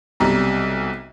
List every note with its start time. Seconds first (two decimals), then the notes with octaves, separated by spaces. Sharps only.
0.20 B1 C3 G3 A#5